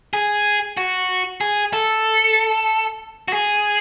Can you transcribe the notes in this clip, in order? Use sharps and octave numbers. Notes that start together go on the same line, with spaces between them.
G#4
F#4
G#4
A4
F#4
G#4